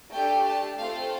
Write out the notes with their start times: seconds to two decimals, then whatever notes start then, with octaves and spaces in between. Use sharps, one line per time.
0.12 A3 D4 G4 G5
0.46 A5
0.79 A3 C4 F4 A4 F5